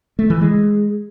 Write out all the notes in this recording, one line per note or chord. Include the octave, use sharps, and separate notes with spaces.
A3
E3
G#3